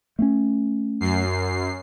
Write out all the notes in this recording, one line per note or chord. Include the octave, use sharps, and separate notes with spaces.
A3 A#3 C#4
F#2 C7